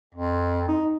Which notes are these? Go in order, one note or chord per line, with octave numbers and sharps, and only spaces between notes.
F2
D#4